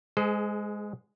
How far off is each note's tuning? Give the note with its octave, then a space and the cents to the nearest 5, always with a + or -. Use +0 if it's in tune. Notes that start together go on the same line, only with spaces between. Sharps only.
G#3 +0 G#4 +30 C5 -30